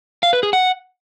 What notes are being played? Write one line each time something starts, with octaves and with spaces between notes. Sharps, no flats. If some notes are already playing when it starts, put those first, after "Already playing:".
F5
B4
G#4
F#5